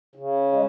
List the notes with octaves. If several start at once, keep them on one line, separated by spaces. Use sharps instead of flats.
C#3
G#3